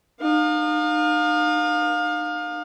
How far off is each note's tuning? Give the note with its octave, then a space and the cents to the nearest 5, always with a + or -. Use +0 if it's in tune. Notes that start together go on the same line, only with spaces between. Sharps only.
D#4 -35 F5 +30